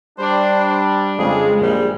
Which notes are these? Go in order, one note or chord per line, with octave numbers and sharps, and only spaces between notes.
G3 D4 C5
F2 C#3 G#3 G#4
A#1 G3